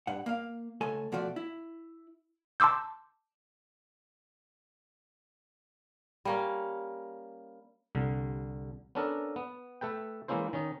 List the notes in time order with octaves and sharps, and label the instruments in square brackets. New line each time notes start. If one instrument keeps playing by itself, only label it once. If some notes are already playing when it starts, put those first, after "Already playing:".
[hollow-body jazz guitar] G2 F#5
A#3 F5
C#2 A3 A4 G#5
B2 F3 A3 F#4 D5
E4
[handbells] A5 C6 D6 E6 G6
[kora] G3 A#3 C#4
[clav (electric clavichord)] C2 D3
B3 C#4 D4 A4 A#4
B3
A3 A4 B4 G5
E3 G#3 A#3 C#4 E4 C5
D#3 C#4 D#4